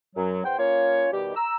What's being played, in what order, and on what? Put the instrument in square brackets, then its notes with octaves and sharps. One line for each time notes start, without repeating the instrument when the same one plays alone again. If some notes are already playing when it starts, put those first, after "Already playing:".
[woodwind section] F#2 F#3
E2 C5 F#5 G5
A#3 C#4 F4 C#5
B2 D#3 G3 G4
A#5 E6